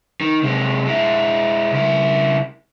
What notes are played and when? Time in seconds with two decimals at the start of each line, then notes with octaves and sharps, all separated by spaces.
0.21 D#3
0.43 C3 G#3
0.86 G#3 E4
1.72 C#2 E4